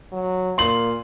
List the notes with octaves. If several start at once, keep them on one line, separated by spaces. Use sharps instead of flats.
F#3
A#2 C6 F#7